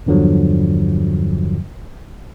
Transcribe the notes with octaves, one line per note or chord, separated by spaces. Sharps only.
E2 G2 D3 F3 F#3